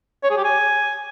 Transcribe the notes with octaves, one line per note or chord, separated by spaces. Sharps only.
C#5
G#4
G4
G#5